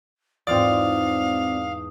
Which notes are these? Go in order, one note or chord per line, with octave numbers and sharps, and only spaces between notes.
E2 G#2 C4 F4 D5 F5 D#6